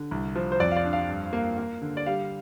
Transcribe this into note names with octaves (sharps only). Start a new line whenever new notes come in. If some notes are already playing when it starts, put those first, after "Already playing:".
Already playing: D3
C2
F3
C5
F2 D5
F5
D5
D4
F5
G2
A#3
A#3
D3
D5
G3 F5